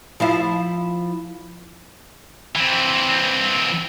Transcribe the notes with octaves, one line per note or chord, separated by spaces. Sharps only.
F3 E4 F5
E3 C4